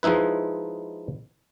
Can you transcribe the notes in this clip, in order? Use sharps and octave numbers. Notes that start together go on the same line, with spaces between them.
F3 G#3 D#4 E4 B4